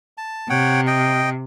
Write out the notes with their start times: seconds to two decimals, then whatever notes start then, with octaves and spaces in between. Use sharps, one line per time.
0.18 A5
0.49 C3 C#5 F#5 G5
0.87 D#5 G5